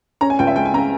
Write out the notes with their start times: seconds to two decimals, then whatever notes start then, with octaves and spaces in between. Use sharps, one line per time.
0.21 C#4 A#5
0.30 G#5
0.39 C#2 G5
0.47 E5
0.56 G#3 G5
0.65 G#5
0.74 C#3 A#5